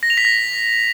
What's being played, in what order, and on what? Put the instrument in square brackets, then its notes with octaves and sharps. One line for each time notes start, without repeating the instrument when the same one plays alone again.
[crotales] A#6
F7
B6
A#6